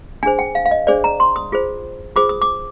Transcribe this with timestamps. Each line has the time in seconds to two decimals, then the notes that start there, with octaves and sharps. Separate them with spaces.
0.23 D4 G#4 C5 G#5
0.39 G5
0.55 F5
0.65 F5
0.71 D#5
0.87 D4 G#4 C5 D5
1.04 A#5
1.20 C6
1.36 D#6
1.52 F4 G#4 C5
2.16 F4 G#4 C5 D6
2.29 D#6
2.42 D6